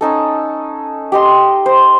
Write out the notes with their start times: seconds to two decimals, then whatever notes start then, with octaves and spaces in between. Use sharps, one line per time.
0.01 C#4 D#4 A4
1.12 G4 D#5 C6
1.66 C5